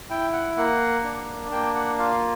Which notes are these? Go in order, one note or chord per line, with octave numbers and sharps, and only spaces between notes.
E4 G5
F#5
A#3 F#5
D4
A#3 G5
F#5
F4 F5